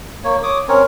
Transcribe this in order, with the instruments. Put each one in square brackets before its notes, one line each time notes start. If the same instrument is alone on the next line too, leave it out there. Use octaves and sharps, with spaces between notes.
[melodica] A#3 C#5
C#5 D6 D#6
C4 C#4 A#4 C#5